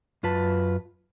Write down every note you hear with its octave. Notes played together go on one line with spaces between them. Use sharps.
F#2 F4 B4 A5